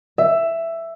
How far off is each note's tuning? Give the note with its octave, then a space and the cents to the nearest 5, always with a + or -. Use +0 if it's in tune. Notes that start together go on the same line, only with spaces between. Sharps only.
E5 +10